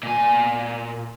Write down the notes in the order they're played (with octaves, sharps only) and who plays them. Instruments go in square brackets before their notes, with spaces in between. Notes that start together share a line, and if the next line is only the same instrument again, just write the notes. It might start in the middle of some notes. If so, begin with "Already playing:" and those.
[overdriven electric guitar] A#2 G#5